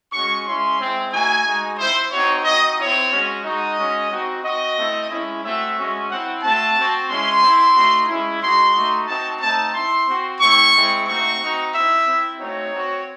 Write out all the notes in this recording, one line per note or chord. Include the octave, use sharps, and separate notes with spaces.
G#3 C#4 F#4 C#6
G#3 C#4 E4 C6
G#3 C4 E4
A3 D#4 F#4 G#5
G#3 D#4 F#4
C4 E4 C5
C4 D#4 F#4 C#5
C4 D#4 F#4 D#5
C4 E4 C#5
G#3 C#4 F#4
G#3 D#4 F#4 D#5
G#3 C#4 F#4
C4 D#4 F#4
C4 F#4 D#5
A3 C4 E4
G#3 C#4 E4
A3 C4 F#4 E5
G#3 C#4 F#4
C4 E4 F#5
A3 C4 F#4 A5
C4 F#4
G#3 C#4 E4 C6
C4 E4
A3 D#4 F#4
G#3 C#4 E4
G#3 D#4 F#4 C6
A3 D#4 F#4
C4 D#4 F#4 A5
A3 C4 D#4 A5
C4 E4 C6
C4 F#4
A3 C4 E4 C#6
G#3 C4 E4
A3 C4 D#4 F#4 C#6
C4 D#4 F#4
C4 E4 E5
C4 E4
A3 C4 D#4 F#4 C#5
C4 F#4